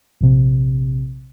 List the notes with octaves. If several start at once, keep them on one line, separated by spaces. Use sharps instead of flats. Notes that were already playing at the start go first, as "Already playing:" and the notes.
A#1 C3